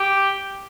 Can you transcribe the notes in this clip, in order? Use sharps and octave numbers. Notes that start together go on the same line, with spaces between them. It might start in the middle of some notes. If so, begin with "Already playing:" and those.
Already playing: G4